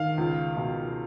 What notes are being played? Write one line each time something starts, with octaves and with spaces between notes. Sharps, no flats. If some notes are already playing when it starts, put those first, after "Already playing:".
Already playing: D#3 F5
C#2
B2